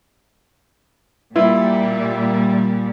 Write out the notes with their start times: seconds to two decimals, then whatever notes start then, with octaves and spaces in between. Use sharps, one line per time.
1.36 A#2 G3 E4 F4